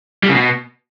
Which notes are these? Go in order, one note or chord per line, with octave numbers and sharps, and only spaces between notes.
G3
C#3
B2